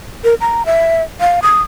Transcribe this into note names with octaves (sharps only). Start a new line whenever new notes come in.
A#4
A#5
E5
F5
D#6